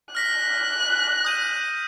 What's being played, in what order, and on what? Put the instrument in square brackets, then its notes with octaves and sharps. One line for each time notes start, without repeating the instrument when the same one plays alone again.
[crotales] F6 A#6 B6 [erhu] F#6
[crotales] D#6 G6 D#7